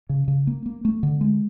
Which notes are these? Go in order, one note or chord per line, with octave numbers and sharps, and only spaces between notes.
C#3
C#3
A#3
A#3
A3
D3
G#3